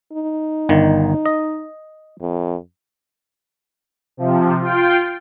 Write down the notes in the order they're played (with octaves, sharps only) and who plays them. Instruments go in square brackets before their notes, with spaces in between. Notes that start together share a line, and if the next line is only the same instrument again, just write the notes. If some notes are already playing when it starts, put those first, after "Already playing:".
[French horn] D#4
[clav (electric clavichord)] G1 D#3
D#5
[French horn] F2
[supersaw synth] C3 F3
F4 G5